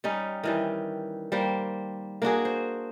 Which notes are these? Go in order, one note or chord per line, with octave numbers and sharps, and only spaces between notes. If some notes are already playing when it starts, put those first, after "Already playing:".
G3 C#4 D#4
D#3 E3 G3
G3 A#3 C5
A#3 D4 F#4 G#4
C5